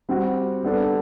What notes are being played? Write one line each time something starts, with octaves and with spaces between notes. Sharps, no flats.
G3 C4 F#4
G3 B3 D4 A4